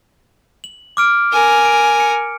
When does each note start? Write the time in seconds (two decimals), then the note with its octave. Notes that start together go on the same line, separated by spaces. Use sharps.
0.64 F#7
0.97 D6 F6 D7
1.32 A#4 G#5
1.65 D7
2.00 C#7